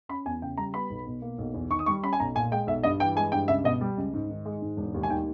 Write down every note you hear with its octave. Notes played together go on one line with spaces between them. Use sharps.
C#4 B5
E2 G#5
C#3 G5
G3 A#5
B3 B5
B1
B2
A#3
B1
E2
D#3 C#6
D#6
G3 C#6
C#4 B5
G#5
B1 A#5
A#2 G#5
G#3 G5
B1 E5
G2 D#5
E3 G5
G#3 G#5
G2 G5
C#2 E5
B2 D#5
G3
C#2
G#2
D#3
G#3
G#2
E1
D#2
G#5
D#3 G5